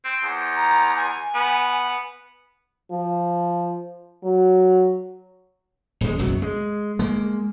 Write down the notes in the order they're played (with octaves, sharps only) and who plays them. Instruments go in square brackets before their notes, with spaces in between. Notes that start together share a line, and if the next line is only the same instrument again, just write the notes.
[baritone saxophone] C4
E2
[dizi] A#5
G#5
[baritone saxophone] B3
[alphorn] F3
F#3
[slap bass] D#1 G#3
F#1 B1 F#2 F#3
G#3
G#3 A#3